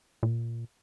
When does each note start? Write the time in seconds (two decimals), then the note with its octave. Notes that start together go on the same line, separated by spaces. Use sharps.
0.23 A#2